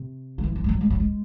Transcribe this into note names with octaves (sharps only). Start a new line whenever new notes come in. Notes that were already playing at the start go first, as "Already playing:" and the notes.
Already playing: C3
F#3
E3
E3
G#3
F#3
G#3
F#3
G#3